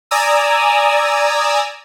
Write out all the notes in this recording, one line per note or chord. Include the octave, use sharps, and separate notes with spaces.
D5 G#5 A#5 D#6 E6